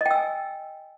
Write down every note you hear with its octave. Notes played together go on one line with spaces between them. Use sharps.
D#5 G5 G#5 E6